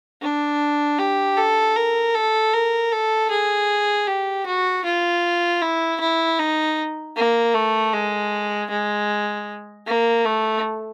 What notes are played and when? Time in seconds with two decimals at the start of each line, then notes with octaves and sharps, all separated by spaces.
0.22 D4
0.99 G4
1.37 A4
1.76 A#4
2.14 A4
2.53 A#4
2.92 A4
3.31 G#4
4.07 G4
4.46 F#4
4.85 F4
5.62 E4
6.00 E4
6.39 D#4
7.16 A#3
7.54 A3
7.93 G#3
8.70 G#3
9.86 A#3
10.25 A3